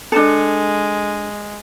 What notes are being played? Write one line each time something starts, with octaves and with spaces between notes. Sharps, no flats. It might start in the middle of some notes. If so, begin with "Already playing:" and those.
G#3 D4 A4